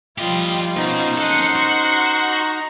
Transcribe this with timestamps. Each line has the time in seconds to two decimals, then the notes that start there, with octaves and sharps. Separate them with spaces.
0.18 F3 G3 F4 G4 D#5
0.77 B2 C#4 D#4 A#4 C5
1.18 A4 D#5 F#5 C6
1.56 F#4
2.21 A#5